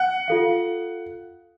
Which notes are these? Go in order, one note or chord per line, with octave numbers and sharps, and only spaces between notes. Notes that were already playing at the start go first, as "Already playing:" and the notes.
Already playing: F#5
F4 A4 F5